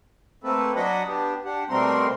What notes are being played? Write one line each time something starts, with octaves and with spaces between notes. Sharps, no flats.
A3 A#3 C4 A4 B4
F#3 D4 F#4 D#5 F#5 B5
B3 D4 G4
D4 G4 F#5
B2 G3 A3 C4 A#4 C6